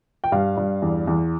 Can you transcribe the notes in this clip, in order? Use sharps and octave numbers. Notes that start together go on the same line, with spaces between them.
G5
G2 F5
G2
E2
E2